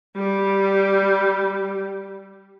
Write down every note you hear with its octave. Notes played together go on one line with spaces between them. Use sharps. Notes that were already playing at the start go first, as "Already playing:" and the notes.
G3 G4